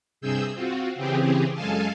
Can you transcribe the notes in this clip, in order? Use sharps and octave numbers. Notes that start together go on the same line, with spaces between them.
G2 C3 G#4 E6 G6
C4 F4 F#4
C#3 E3 C4 G4 G#4
F#2 G#3 A4 F5 G#5 A5